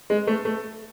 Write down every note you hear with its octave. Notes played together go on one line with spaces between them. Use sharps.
G#3
A3
A3